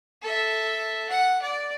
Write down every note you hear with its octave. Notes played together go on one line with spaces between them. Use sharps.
A4 E5
F#5
D5